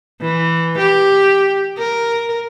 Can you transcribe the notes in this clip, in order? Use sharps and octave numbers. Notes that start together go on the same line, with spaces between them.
E3
G4
A#4